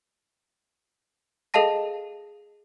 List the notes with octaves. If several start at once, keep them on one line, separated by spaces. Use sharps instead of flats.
G#4 A4 D#5 F5 A5 A#6